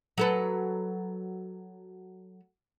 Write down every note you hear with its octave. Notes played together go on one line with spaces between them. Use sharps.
F#3 A4 B4